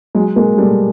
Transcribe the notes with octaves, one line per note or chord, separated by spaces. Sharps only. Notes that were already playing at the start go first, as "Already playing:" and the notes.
F#3 G#3
G#3 A#3
G3 A3